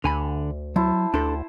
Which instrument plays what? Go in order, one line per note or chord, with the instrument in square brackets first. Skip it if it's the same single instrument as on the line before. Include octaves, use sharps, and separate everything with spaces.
[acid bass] D2 [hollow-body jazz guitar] D3 G#5 B5
[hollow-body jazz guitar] F#3 [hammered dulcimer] E4 C5 A5
[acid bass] D2 [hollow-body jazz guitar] D4 A4 [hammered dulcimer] C5